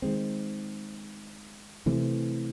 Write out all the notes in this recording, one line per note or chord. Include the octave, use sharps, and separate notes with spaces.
D#3 G#3 C4
C3 E3 A3 C4